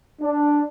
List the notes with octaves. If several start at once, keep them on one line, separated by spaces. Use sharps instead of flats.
D4